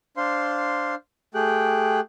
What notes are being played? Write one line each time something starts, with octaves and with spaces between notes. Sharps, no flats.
D4 C5 F5 C6
A3 G4 G#4 G5 F#6